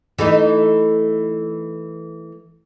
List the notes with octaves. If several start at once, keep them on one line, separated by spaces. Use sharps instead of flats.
E3 A3 D#4